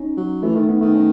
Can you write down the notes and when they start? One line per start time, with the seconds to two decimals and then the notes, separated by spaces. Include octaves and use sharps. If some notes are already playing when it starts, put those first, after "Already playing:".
Already playing: C#4 D#4
0.17 F#3
0.43 E3 A3
0.55 D#3 A3
0.68 D#3 B3
0.81 D#3 A3
0.94 C#4